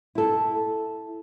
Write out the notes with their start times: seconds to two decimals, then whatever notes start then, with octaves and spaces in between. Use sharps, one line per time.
0.15 E4 A4